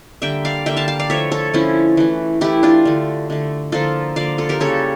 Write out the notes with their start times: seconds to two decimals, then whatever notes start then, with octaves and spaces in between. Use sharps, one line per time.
0.22 D3 G3 A#3 E5 G5
0.45 D5 F5
0.66 D3 G3 A#3 E5 G5
0.77 F5 A5
0.88 F5 A5
0.99 D5 F5
1.10 D3 F3 A3 C#5 E5
1.32 A4 C#5
1.53 D3 F3 A3 C#4 E4
1.97 E3 A3
2.41 E3 A3 E4 G4
2.63 D4 F4
2.85 D3 A3
3.30 D3 A3
3.72 D3 F3 A#3 F4 A4
4.16 D3 F3 A#3 D5 F5
4.38 F4 A4
4.49 G4 A#4
4.60 C#3 G3 A#3 A4 C#5